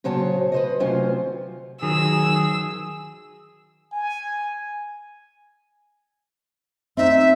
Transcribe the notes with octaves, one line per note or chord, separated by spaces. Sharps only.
A#2 C#3 F#3 C5 C#5 A5
B4 C5 D#5
D2 C3 F#3 C#4 F4 C5
D#3 F#3 G#4 E6
G#5
C4 D#4 E5